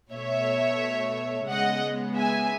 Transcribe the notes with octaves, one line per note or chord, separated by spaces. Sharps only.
B2 A3 C#5 E5
C#3 G#3 B3 D#5 F#5
E5 G#5